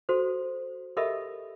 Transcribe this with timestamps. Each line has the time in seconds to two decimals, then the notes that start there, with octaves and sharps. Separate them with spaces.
0.09 F#4 A4 C5
0.97 G4 A4 A#4 D#5 E5 B5